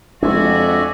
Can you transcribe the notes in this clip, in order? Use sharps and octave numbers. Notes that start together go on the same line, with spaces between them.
F2 G#3 D4 F#4 D5 E5 G#5